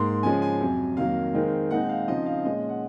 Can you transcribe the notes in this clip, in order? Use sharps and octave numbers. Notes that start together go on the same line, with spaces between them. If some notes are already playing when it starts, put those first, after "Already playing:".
Already playing: G#2 A#3 C6
C#3 F3 G#3 C#4 G#5
G#5
F2 C3 F#3
F2 D#3 F#3 A#3 F5
D#3 G#3 C4
A#2 G#3 C4 D#4 F#5
F5
C#3 F3 C4 D#4 D#5
F5
A#2 G#3 C#4 D#5
F#5